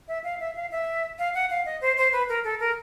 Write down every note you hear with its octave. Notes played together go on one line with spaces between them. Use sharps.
E5
F5
E5
F5
E5
F5
F#5
F5
D#5
C5
C5
B4
A#4
A4
A#4